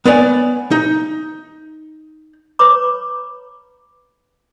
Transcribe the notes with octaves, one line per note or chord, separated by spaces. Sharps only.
B3 B4 C#5 D5 G#5
D#4
B4 C#5 A#5 B5 D6